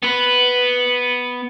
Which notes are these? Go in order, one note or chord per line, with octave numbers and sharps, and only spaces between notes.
B3 B4